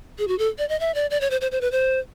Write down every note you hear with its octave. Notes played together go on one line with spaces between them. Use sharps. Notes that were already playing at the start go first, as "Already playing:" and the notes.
G#4
F#4
A4
D5
D#5
E5
D5
D5
C#5
C5
C5
C5
B4
C5